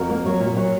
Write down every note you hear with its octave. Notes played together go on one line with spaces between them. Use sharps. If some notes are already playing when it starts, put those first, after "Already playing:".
Already playing: F2 F#4 A#4
A#3
F#3
A#2
F#3